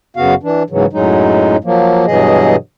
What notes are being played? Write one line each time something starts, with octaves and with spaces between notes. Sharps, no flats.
F#2 C#3 B3 F#4 F5
E3 D4
G#2 C#3 E3 F#3
F#2 A2 F#3 G#3 D#4
F3 F#3 A#3
G2 B2 E3 F#3 G#4 D#5